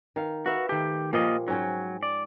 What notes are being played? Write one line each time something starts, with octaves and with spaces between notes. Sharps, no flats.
D#3 F5
F#4 B4 E5 F5
D#3 A3 G4
A#2 F3 G3 A#3 F4 D#5
G#2 F#3 C#4 G5
D5